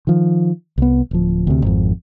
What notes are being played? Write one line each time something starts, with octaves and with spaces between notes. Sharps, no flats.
D#3 F3
C2 B3
D1 F3
D2 C3
G#1 F2